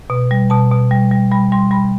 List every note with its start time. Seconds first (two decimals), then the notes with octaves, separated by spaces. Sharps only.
0.10 B2
0.31 G3
0.50 B2 A5
0.71 B2
0.91 G3
1.11 G3
1.31 G3 B5
1.52 G3 C6
1.71 G3 B5